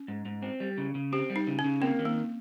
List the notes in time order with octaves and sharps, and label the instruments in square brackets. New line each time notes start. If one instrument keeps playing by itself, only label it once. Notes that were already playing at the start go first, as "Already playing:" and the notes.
Already playing: [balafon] C#4
[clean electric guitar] G#2
G#2
C4
G3
C#3
C#3
[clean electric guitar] C4 [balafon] G4
[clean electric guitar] G3
[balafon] D#4
[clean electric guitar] C#3
[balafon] C#4
[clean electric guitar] C#3
[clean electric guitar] A#3 [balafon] C4
[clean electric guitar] D#3
[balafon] A#3